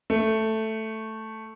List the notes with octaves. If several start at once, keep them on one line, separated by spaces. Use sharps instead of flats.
A3